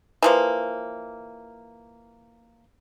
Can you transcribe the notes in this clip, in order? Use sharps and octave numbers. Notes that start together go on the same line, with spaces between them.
E3 F3 A#3